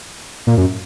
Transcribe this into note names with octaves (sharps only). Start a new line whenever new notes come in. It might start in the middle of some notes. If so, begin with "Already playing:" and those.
A#2
F#2